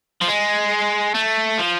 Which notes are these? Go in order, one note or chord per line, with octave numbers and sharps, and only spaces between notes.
F3
G#3
A3
F3